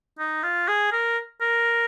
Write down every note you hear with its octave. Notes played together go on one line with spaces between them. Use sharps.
D#4
F4
G#4
A#4
A#4